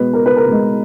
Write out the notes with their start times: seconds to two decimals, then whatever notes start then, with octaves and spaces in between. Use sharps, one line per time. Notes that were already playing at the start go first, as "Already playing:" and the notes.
Already playing: B2 G#3 B4
0.13 A#4
0.26 B4
0.37 A#4
0.47 B2 G#3